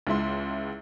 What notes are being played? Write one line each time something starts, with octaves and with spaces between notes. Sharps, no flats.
C#2 G#3 E4 E5 C6